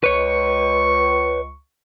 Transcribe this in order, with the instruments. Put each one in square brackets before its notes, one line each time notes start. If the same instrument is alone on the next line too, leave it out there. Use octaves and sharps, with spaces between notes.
[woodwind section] C#2 C#6 [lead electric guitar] B4 C#5